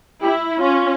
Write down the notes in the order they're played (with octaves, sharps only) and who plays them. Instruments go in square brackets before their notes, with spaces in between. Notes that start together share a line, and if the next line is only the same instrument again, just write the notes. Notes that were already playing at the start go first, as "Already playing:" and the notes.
[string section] E4 [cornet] G4
[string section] C#4 [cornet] F4